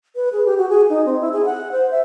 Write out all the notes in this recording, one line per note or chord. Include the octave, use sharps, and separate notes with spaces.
B4
G#4
G4
F#4
G#4
D#4
C4
E4
G#4
F#5
C5
E5